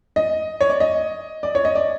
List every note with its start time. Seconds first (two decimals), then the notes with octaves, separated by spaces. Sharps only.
0.16 D#5
0.61 C#5
0.69 D5
0.80 D#5
1.43 D5
1.55 C#5
1.65 D#5
1.75 D5